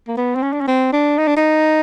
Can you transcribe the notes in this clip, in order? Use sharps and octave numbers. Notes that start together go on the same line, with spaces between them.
A#3
B3
C4
C#4
D4
C#4
C4
D4
D#4
D4
D#4